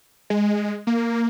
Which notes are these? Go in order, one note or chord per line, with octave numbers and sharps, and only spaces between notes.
G#3
A#3